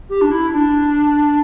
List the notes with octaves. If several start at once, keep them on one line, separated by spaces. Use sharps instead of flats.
G4
D4
E4
D4